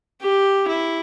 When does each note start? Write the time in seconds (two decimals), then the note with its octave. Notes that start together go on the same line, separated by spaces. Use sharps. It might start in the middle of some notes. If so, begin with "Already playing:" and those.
0.21 G4
0.68 E4